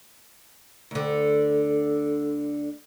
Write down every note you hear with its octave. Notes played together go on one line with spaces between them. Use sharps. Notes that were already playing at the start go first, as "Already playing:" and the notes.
D2 D3